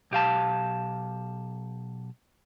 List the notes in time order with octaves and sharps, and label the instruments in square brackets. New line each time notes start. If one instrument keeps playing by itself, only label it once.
[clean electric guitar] B1 G4 F5 A5